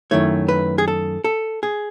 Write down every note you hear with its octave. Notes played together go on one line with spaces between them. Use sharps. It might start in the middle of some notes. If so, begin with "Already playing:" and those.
F#2 D#3 A3 E4 C#5
B4
G#4
A4
A4
G#4